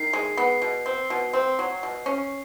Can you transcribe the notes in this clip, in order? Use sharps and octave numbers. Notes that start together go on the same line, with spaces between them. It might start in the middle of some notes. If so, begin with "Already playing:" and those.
Already playing: D#3 C7
G#3
B3
B2
C4
B2
C4
F#3
B2
C#4